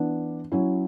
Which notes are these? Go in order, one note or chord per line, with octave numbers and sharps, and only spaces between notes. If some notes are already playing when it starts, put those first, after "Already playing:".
Already playing: E3 B3 D4
F#3 C#4 E4